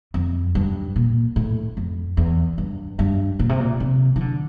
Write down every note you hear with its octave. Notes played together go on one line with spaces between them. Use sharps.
F2
G2
A#2
A2
F2
E2
G2
G2
A#2
C3
A#2
C3
E3
D3